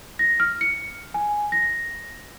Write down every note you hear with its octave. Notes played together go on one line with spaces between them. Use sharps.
A#6
F6
C#7
G#5
A#6